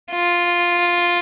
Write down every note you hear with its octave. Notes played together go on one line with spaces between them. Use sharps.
F4